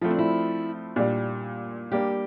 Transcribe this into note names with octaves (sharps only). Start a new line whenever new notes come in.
F3 A3 C4 E4
D4
E4
A#2 G3 D4
G3 A#3 D4 G4